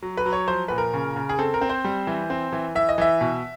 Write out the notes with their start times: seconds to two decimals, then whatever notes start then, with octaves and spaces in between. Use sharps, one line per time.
0.02 F#3
0.17 B4
0.26 F#3
0.33 C#5
0.48 F3 C5
0.68 A#2 B4
0.78 A#4
0.94 C#3
1.16 C#3
1.29 G#4
1.39 C4 A4
1.54 A#4
1.61 C4
1.70 C5
1.85 G3
2.07 E3
2.30 C4
2.52 E3
2.75 E3 E5
2.89 D#5
2.98 E3 E5
3.21 B2